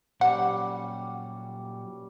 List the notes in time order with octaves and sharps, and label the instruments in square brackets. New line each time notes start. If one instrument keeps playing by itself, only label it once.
[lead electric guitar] A#2 F#3 [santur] G3 C#4 G4 [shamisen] F#5